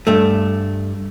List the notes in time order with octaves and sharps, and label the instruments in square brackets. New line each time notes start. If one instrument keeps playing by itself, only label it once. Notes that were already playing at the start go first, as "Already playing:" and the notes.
[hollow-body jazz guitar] G2 A3